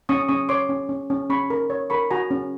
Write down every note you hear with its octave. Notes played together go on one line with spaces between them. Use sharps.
C#4 C#6 D#6
C#4 C#6 D#6
C#5 C6 D6
C#4
C#4
C#4
C#4 B5 C#6
A#4
C#5
A#4 B5 C#6
F#4 G#5 A#5
C#4